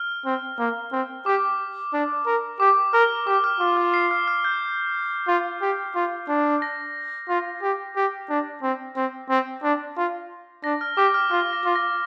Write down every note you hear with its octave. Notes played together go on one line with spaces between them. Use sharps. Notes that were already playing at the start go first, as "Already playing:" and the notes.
Already playing: F6
C4
A#3
C4
G4 D6
D4
A#4
G4 D6
A#4 F6
G4 D6
F6
F4 D6
F6
C7
F6
F6
G6
F4
G4
F4
D4
A#6
F4
G4
G4
D4
C4
C4
C4
D4
F4
D4 A#6
F6
G4 D6
F6
F4 F6
A#6
F4
A#6